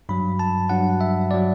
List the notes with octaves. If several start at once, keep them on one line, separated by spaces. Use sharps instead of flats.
G2 F#3 B5
A5
G2 F#3 F#5
E5
F#3 D5